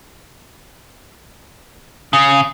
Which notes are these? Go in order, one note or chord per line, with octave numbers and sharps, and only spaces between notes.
C#3